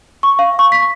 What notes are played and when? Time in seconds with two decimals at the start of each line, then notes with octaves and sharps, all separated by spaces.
0.23 C#6
0.39 F5
0.59 C#6
0.72 B6